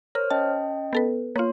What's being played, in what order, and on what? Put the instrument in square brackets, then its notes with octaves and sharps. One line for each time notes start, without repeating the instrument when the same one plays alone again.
[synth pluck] A#4 [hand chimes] C5 C#5 F6
[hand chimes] C#4 D#5 G5 [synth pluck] A5
[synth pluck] B3 A4 B4
[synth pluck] A#3 F4 [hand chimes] C#5 C6